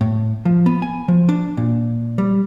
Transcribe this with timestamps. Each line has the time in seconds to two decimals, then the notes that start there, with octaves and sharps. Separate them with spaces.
0.01 A2
0.45 F3
0.66 B3
0.82 G#5
1.08 F3
1.29 D4
1.57 A#2
2.18 G3